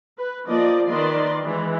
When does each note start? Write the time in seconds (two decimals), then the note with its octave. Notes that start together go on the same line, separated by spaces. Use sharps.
0.18 B4
0.47 F3 A#3 D5 D#5
0.89 D#3 B4 D5 D#5 C6
1.44 E3 G#3 E4